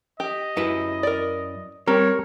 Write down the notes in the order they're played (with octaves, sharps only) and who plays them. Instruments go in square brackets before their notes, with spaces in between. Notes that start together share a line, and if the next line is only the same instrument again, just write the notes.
[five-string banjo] G4 [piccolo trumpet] D#5
[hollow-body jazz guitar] F#2 E4 B4
[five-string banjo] A#4 D5
[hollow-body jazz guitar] G3 [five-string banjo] C4 [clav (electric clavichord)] A#4 [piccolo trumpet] C#5